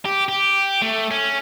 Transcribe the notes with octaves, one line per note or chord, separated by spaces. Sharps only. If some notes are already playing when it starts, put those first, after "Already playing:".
G4
G4
A3
C#4